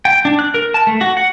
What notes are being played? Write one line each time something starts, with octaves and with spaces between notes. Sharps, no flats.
G5
D4
F#6
A#4
A5
A3
F#4
F#5